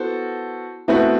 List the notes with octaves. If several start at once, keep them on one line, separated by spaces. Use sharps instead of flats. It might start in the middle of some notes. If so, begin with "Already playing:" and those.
Already playing: B3 E4 F#4 A4 C5
B2 A3 C4 E4 F#4 B4 E5